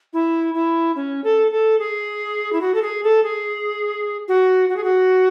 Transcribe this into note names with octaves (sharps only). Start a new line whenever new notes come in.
E4
E4
C#4
A4
A4
G#4
E4
F#4
A4
G#4
A4
G#4
F#4
F#4
G#4
F#4